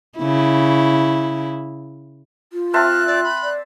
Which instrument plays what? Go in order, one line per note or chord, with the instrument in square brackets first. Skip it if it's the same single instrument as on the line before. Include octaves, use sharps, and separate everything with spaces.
[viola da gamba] C#3 E4
[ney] F4
[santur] C4 E5 A5 [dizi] F6 [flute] F#6
[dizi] D5
B5
[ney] D5